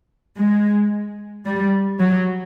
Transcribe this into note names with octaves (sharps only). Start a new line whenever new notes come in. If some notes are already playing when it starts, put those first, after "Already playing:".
G#3
G3
F#3